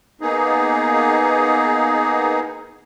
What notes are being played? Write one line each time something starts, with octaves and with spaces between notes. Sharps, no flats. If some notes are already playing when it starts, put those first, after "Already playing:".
A#3 B3 D#4 G#4